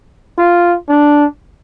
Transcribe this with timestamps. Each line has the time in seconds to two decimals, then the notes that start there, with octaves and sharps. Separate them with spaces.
0.38 F4
0.89 D4